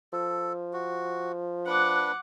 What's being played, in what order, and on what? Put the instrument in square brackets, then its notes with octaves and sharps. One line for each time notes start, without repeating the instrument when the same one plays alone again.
[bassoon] F3 [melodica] A4
[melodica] F#4
[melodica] D4 B4 [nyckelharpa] F#5 D6